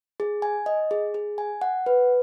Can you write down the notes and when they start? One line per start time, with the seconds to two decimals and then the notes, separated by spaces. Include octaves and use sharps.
0.20 G#4
0.42 G#5
0.66 D#5
0.91 G#4
1.14 G#4
1.38 G#5
1.61 F#5
1.86 B4